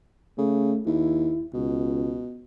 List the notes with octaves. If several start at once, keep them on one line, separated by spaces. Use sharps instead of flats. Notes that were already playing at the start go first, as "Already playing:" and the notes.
C#3 A3
D#2 E4
C#2 B2